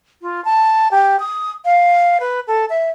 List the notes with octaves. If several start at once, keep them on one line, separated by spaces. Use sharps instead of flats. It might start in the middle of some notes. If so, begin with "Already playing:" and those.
F4
A5
G4
D#6
F5
B4
A4
E5